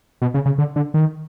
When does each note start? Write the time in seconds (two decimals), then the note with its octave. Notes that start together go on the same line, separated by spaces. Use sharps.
0.22 B2
0.34 C#3
0.46 C#3
0.58 D3
0.76 D3
0.94 D#3